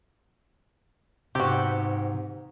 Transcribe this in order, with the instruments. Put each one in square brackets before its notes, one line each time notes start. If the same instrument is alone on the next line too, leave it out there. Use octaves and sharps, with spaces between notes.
[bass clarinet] G#2 [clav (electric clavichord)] C3 B3 [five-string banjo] F#4 G4